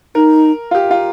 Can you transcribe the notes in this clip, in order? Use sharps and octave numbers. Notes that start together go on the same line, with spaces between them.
D#4 A#4
F4
G4
F4